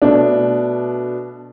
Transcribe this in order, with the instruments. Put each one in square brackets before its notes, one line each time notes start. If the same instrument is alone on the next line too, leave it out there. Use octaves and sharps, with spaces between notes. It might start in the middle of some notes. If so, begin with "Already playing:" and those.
[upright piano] B2 A3 D4